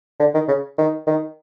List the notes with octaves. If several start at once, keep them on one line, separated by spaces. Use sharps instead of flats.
D3
D#3
C#3
D#3
D#3